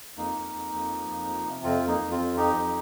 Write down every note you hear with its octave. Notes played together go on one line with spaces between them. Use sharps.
F2 A#3 D#4
F2
F2
F2
F3
F2
F3
C3
F2 C4 F4
F2
A#3 D#4
F2
C4 F4
F2
F3 D#4 G4
F2